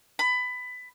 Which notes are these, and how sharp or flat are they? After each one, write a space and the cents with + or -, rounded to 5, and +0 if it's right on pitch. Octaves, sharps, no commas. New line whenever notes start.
B5 +20